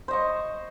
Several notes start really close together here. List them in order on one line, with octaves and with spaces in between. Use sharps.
C5 D#5 C#6